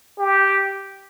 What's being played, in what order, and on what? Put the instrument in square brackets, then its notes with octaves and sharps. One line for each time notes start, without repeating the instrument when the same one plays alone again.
[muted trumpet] G4